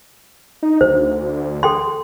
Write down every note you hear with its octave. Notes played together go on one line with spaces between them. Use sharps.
D#4
D2 C5
A4 G5 C6